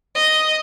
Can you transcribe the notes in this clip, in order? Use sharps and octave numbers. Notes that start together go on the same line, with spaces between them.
D#5